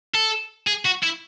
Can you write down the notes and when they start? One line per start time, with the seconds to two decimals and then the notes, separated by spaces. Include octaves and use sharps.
0.15 A4
0.68 G#4
0.86 F#4
1.03 E4